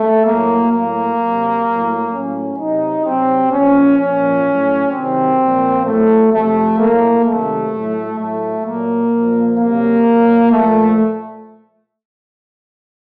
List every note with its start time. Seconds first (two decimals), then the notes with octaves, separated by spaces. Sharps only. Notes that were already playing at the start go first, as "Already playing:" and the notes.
Already playing: A3
0.25 A2 F#3 A#3
0.72 A2 F#3 A#3
1.19 C3 F#3
1.65 A2 F#3
2.12 A2 F#3 C#4
2.58 C3 F#3 D#4
3.05 C3 F#3 C4
3.52 A#2 F3 C#4
3.98 A#2 F3 C#4
4.45 A2 F#3
4.91 C3 D#3 F#3 C4
5.39 A#2 F3
5.85 A2 F#3 A3
6.32 C3 F3 A3
6.79 A2 F#3 A#3
7.25 C3 D#3 F#3 A3
7.72 A2 F#3
8.18 A2 F#3 A3
8.65 A#2 F#3 A#3
9.12 A#2 F3
9.58 C3 F#3 A#3
10.05 A#2 F#3
10.52 A#2 F3 A3